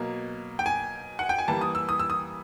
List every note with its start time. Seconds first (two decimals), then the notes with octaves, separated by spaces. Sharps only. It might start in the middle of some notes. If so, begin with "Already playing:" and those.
Already playing: B2 F#3 A#3
0.59 G5
0.66 G#5
1.19 F#5
1.29 G5
1.38 G#5
1.48 E3 G3 A#3 A5
1.61 D#6
1.75 E6
1.89 D#6
1.99 E6
2.10 D#6